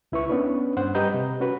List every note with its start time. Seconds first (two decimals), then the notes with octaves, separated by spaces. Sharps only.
0.12 C#2 E4 B4 C#6
0.29 B3 C#4 D4 B4
0.77 G2 C5 F#5
0.95 G3 G4 B4 D#5 A#5 G6
1.14 C3
1.40 C#4 F#4 B4